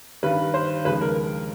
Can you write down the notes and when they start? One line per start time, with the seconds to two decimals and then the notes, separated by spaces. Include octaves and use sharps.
0.23 G2 D#3 G3 B4
0.54 C5
0.85 D#2 C#3 F3 G#3 B4
1.01 A#4